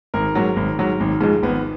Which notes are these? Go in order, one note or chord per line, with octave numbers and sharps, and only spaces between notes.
G#1 A#4
G#2 F#3
G#1
G#2 F#3
G#1
G#2 F3 G#3
G#1 B3